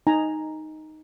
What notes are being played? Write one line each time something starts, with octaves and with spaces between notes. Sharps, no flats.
D#4 G#5 A#5